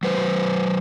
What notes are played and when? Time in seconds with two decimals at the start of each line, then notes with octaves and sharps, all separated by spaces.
0.03 F#3 B4 C5